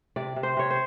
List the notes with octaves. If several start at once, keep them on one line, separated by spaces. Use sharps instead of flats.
C3 D5
C3
C5
C3 C#5
C5